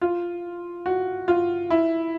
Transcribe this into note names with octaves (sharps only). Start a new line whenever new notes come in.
F4
F#4
F4
E4